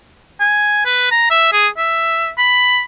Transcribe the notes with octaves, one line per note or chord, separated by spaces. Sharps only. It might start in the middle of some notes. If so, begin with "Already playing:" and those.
G#5
B4
A#5
E5
G#4
E5
B5